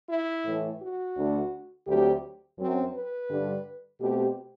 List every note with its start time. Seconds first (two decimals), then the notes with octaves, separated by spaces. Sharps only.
0.10 E4
0.45 A2 E3 A3
0.80 F#4
1.16 D2 D3 A3 D4
1.87 D2 D3 F#3 A3 C4 G4
2.58 F#2 F#3 C4
2.94 B4
3.30 G2 D3 G3 D4
4.00 B2 A3 C4 G4